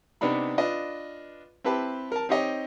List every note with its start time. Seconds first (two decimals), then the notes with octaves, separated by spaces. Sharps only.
0.21 C3 B3 D4 D#4 B5
0.58 D4 F4 B4 D#5
1.64 C4 E4 G4 B4 A5
2.12 A#4 A5
2.29 C4 D#4 G4 C#5 D#5